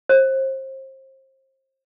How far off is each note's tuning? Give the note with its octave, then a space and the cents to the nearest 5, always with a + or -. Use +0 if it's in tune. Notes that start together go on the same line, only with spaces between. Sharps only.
C5 +30